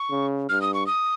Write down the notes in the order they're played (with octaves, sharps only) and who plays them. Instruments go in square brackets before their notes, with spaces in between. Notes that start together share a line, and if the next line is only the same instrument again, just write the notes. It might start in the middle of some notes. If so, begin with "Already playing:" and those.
Already playing: [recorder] C#6
[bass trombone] C#3
[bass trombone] G2 [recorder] F6
[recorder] D#6
C#6
D#6